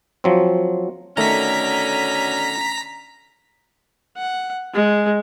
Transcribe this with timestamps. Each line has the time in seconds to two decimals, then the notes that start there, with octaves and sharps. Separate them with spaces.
0.24 F3 F#3 C4
1.17 B2 D3 D#3 A3 C#4 A#5 B6
4.17 F#5
4.74 G#3